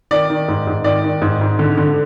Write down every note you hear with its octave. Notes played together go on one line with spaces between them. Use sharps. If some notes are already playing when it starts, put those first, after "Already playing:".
D#3 D5
D#3
G#2
G#2
D#3 D5
D#3
G#2
G#2
D3
D3